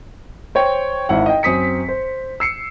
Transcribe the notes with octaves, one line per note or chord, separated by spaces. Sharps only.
C5 C#5 G5
G#1 E4 F#5
D#5 G5
F#2 C4 D#6 B6 C#7
C5
E6 C7 C#7